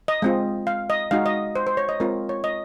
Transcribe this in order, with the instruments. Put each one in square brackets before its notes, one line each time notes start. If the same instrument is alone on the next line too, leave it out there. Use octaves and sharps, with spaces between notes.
[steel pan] D#5
G#3 C4 F4
F5
D#5
G#3 D#4 F#4 F5
D#5
C5
C5
C#5
D#5
G#3 C4 F4 A#4
C#5
D#5